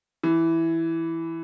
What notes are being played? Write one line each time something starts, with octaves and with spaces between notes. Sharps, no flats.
E3